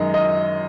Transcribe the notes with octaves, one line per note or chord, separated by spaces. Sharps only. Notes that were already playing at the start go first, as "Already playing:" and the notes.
Already playing: F#2 D#3 G#3 D#5
D#5